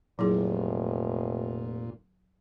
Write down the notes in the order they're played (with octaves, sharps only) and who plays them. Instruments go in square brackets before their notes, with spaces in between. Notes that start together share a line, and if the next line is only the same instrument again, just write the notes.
[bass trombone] F1 [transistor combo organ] A#2 [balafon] F#3 E4 G#4